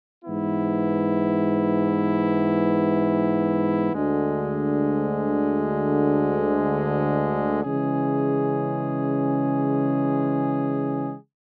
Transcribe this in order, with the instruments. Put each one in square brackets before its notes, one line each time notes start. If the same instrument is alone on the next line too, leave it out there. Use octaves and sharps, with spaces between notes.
[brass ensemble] G#2 E3 B3 E4
D2 D3 G#3
C#3 E3 G#3 C#4 G#4